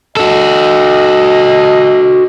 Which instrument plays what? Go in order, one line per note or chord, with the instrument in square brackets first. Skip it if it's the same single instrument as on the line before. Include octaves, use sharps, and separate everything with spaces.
[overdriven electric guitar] F#4 A4 [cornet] D#5